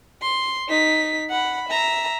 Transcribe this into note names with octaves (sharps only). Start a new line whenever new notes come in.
C6
D#4 B6
F#5 B5
E5 A#5